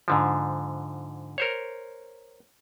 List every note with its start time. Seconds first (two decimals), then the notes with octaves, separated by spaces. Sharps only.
0.08 G#2 D3 F3
1.38 A#4 C5 C#5